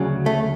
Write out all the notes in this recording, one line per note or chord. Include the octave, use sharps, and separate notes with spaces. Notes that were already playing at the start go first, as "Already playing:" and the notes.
Already playing: D2 C#3 F#3
A3